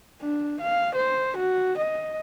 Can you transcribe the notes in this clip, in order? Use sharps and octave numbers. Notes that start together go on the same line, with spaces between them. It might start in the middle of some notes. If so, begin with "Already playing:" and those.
D4
F5
C5
F#4
D#5